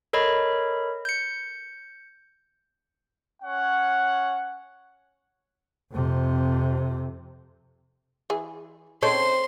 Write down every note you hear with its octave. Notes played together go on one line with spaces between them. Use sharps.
A4 A#4 C#5 D#5 B5
G6 C#7
C#4 C#5 F#5
F2 C3
E3 G#4
C#3 C4 D#4 A4 C#5 G5 C6